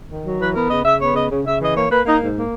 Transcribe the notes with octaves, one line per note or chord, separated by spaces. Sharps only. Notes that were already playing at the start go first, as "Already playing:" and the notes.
D#3
F#3
E3 B4
B3 A#4
C#3 D#5
C#3 E5
B3 C#5
C#3 D#5
C#3
C#3 E5
E3 D#5
A#3 C#5
A#3 B4
A#3 D#4
G#2
A#3